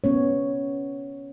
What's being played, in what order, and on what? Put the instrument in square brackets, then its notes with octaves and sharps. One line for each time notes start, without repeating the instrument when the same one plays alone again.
[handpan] B3 C#4 C#5